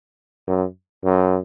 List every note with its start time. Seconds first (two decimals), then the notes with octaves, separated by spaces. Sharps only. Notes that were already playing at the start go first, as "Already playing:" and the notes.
0.47 F#2
1.04 F#2